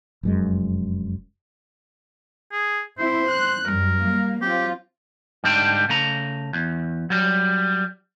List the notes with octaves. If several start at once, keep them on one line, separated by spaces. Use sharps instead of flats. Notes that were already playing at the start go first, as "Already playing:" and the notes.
F1 F#2 G#3
G#4
C4 E4 C5
F#6
F#2 G3 A#4
G3 A#3
F#3 C4 F4 G4
G#2 D3 G3 D4 G5
C#3 A3 A#5
E2
F#3 G3